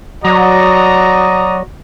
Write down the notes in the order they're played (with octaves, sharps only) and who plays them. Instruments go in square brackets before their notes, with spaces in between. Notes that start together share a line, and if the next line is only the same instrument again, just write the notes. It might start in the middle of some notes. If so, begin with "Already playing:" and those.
[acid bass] F#3 [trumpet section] F#4 D5 [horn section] D#5 A#5